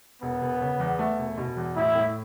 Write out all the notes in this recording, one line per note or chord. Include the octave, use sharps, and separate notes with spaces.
E1 B3
E1
C#3
E2
A3
E1
B2
E2
A2 E4
A2